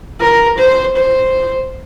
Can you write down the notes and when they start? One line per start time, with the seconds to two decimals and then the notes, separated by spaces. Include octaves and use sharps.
0.20 A#4
0.58 C5
0.96 C5